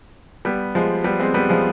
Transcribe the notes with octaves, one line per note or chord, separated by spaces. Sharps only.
G3 B3
F3 G#3
G3 B3
G#3 C4
G3 B3
F3 G#3